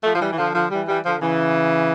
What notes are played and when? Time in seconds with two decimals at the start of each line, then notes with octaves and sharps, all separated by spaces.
0.03 F3 A3
0.15 F3
0.20 E3 G3
0.33 E3
0.37 D3 F3
0.54 D3 F3
0.71 E3 G3
0.88 E3 G3
1.05 D3 F3
1.22 C#3 E3